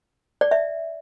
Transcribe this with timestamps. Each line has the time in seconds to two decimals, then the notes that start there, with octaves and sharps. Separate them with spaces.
0.41 D5
0.51 E5